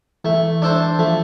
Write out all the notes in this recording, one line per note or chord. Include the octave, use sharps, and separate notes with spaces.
E3 A3
D4 A4 C5
F3 A3